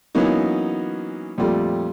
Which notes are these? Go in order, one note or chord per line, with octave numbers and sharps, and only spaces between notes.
E3 F#3 A#3 B3 C#4 D#4
F2 A#2 G3 A3